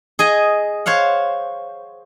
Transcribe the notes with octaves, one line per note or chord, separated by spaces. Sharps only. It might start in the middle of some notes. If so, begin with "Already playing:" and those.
G#4 D#5 G#5
C5 C#5 F5 F#5